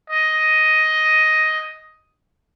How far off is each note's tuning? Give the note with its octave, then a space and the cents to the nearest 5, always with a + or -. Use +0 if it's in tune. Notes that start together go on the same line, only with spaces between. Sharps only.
D#5 +5